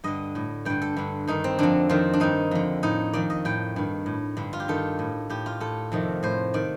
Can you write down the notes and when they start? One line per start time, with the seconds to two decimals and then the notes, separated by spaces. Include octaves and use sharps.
0.04 G2 D3 D#5
0.35 A2
0.65 G2 D3 G5
0.82 A4
0.97 G2 D3
1.27 G2 D#3 D#4
1.44 C4
1.59 F2 D3 D4
1.89 F2 D#3 C4
2.13 D4
2.20 G2 D#3 D#4
2.51 F2 D3
2.83 A2 D#4
3.13 F2 D#3 D5
3.30 D#5
3.45 A2 G5
3.76 G2 D#3
4.06 A2
4.37 G2 D3
4.53 F4
4.60 G4
4.68 G2 D#3 A4
4.99 A2
5.30 A2 G4
5.46 F4
5.60 A2 A4
5.92 F2 C3 D#3
6.23 A2 C5
6.54 D#3 D5